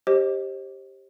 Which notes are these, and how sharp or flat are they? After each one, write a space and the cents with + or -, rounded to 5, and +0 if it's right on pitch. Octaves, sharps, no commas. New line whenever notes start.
G4 +0 C5 +30 D#5 +0